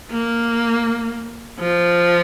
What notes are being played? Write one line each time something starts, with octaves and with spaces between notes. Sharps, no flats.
A#3
F3